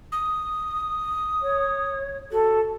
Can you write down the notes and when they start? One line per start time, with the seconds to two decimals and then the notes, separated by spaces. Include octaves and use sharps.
0.12 D#6
1.42 C#5
2.32 F#4 A4